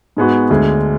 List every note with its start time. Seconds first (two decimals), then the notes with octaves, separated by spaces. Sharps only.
0.17 G#2 G#3 B3 F#4
0.50 D2 D3 G#3